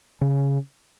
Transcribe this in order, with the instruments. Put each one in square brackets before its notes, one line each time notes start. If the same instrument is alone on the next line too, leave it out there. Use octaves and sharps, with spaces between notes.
[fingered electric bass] C#3